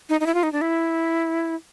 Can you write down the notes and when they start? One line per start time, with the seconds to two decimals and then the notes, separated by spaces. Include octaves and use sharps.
0.09 D#4
0.20 D#4
0.26 E4
0.34 F4
0.43 D#4
0.52 D4
0.61 E4